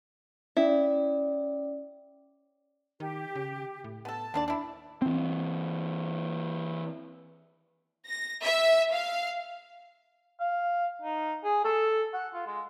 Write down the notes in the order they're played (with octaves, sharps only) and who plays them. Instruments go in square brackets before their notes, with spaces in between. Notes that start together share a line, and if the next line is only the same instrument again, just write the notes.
[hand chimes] C#4 D5 [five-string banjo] E4
[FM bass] D#3 [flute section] G4
[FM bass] C#3
A2
[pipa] B3 A4 [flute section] A5
[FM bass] D#2 [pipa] D3 D4 D5
[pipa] D4 E4
[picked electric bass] E3 C4
[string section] A#6
E5
F5
[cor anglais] F5
D#4
G#4
A4
F#5
F4
G#3